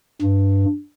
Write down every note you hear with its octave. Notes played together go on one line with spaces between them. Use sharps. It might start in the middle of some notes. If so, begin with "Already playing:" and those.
G2